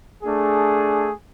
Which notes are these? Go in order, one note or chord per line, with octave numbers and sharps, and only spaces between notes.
A3 D4 G#4